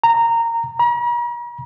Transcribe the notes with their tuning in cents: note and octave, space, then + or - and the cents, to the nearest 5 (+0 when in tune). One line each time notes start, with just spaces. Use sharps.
A#5 -15
A#5 +45